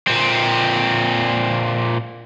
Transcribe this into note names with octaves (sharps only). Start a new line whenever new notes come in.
A#2 C4